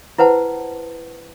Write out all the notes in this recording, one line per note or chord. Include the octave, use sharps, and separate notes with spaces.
E4 B4 C5 F#5 A5